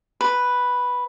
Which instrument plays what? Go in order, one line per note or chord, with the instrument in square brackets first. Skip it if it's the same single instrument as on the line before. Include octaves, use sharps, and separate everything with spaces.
[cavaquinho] B4